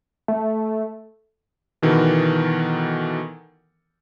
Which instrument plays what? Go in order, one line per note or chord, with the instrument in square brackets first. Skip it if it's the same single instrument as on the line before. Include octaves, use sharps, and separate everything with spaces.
[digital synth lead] A3
[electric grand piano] B2 D#3 E3 B3 A4 A#4